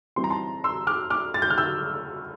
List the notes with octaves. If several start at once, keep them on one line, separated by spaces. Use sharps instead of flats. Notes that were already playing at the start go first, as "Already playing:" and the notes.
E3 G3 C4 C6
A#5
A5 C6
C6 E6
D6 F6
D6 F6
A6
G6
F6
E6 G6